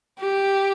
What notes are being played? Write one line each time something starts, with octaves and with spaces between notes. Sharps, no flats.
G4